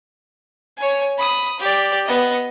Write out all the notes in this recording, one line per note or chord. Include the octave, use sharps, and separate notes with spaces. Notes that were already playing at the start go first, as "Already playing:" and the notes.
C#5 G#5
B5 D#6
G4 D5
B3 D#5